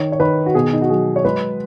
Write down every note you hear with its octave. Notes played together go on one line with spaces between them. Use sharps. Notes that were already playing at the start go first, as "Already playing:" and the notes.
Already playing: D#3 C#5
C#5
D#3 B4
F#4
B2 G#4
D#4
F#4
F#3 G#4
C#5
G#3 B4